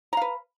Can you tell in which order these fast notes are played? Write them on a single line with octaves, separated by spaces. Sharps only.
A#5 F5 B4